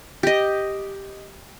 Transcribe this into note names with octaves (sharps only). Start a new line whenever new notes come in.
G4 D#5